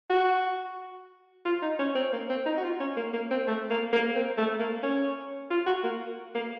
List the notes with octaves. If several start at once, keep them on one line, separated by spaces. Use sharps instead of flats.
F#4
F4
D#4
C#4
C4
A#3
C4
D#4
F#4
F4
C#4
A#3
A#3
C4
A3
A#3
A#3
C4
A3
A#3
C#4
F4
F#4
A#3
A#3